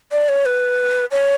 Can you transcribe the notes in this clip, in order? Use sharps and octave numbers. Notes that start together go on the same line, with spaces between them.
D5
C#5
B4
C#5